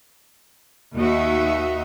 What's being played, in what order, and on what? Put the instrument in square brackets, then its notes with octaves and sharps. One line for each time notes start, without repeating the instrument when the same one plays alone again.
[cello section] D#2 D#4 F#4 D#5 E5